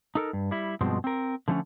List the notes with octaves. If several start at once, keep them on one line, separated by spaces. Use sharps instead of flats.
D#4 A4 A#4
G2
G3 E4
G2 B2 F3 G#3 C4
C4 A#4
D3 F3 A3 C4 C#4